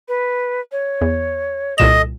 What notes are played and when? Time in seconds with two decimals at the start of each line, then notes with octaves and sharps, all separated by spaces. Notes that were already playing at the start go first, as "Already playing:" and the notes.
0.08 B4
0.72 C#5
1.01 E2
1.78 C2 A#2 A4 D#5 E7